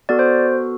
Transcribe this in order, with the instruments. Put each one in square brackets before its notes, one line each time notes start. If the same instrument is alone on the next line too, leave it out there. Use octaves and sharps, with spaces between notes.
[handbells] B3 F#4 A4 D5
C5